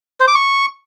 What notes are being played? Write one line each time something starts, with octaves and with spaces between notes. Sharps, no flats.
C5
D6
C#6